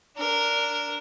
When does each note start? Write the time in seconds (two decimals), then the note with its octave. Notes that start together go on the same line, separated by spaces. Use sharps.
0.17 D4 A#4